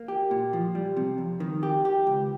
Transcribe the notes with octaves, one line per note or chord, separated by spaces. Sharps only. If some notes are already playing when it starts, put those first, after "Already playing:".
Already playing: A#3
G4
A#2
F3
G3
C3
F2
D#3
G4
G4
C#2